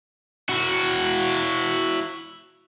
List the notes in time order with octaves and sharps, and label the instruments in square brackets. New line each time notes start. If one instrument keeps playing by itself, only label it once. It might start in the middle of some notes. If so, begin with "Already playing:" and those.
[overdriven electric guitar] E4 F#4